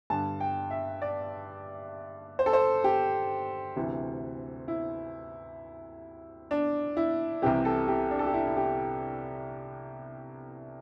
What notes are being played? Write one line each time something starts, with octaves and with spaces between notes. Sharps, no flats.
G2 D3 A5
G5
E5
D5
C5
A4
C5
G4
D2 C3 E3
E4
D4
E4
C2 C3 E3 G4
A4
G4
D4
A4
G4
E4
E4
G4